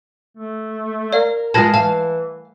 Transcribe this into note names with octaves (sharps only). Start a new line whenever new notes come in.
A3
A#4 D5 F5
G#3 F4 B4 A5 G#6 A#6
E3 F5 A5